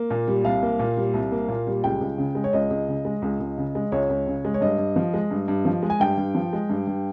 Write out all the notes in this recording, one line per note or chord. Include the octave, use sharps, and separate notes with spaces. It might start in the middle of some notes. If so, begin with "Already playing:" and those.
Already playing: A#3
A#2
G3
C2 F5
A#3
A#2
G3
C2
A#3
A#2
G3
C#2 G5
C#2
C#3
G#3
C#5
C#2 D#5
C#2
C#3
G#3
C#2
C#2
C#3
G#3
C#2 C#5
C#2
C#3
G#3
C#5
G2 D#5
G2
F3
G#3
G2
G2
F3
G#3
G#5
G2 G5
G2
F3
G#3
G2
G2